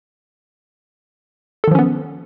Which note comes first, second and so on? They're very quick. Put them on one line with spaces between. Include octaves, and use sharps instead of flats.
A4 D#3 F3 C#4 B3